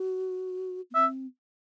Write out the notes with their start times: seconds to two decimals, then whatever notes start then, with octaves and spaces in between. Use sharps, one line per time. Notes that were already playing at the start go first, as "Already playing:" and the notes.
Already playing: F#4
0.91 B3
0.95 C4 E5